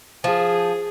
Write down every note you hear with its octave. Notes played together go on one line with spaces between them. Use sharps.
F3 G#4